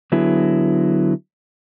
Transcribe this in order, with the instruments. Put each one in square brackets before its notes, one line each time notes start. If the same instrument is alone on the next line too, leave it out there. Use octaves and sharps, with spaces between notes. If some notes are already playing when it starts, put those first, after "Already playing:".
[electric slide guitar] D3 F#3 B3 E4 G#4